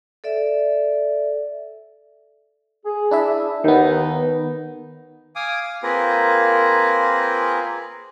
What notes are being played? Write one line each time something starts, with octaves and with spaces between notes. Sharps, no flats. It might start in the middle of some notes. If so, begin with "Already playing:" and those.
A4 D5 E5
G#4
D4 E4 E5
D#2 D#3 B3 D#4
F5 G#5 D6 D#6
F5
A#3 C4 F4 G#4 A#4 B4